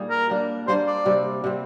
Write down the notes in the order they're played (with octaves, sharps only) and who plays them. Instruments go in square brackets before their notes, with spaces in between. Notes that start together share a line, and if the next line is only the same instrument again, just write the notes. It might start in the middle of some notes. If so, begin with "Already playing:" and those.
Already playing: [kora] A#2 G3 A#3 D#4 G#4
[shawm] A#4
[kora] G3 A#3 D4
[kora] G3 A#3 D4 [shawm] C5
[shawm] D5
[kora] C3 G3 C4
C3 G3 C4